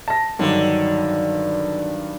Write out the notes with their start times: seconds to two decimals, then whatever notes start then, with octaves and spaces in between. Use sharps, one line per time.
0.08 A5 A#6
0.39 G2 D3 D#3 F#3